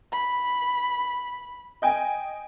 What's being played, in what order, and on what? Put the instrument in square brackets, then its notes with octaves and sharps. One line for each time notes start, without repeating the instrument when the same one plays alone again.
[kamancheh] B5
[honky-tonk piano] D#5 G5 G#5